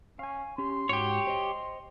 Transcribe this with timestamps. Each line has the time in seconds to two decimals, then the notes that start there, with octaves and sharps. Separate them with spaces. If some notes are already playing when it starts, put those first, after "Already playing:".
0.19 C#4 F5 G#5
0.58 C#4 G4 C6
0.89 G#2 F#4 G4 C#5
1.27 C5 D#5